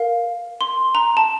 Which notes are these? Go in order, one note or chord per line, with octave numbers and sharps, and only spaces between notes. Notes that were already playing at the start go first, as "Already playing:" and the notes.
Already playing: A#4 F5
C6
A#5
A5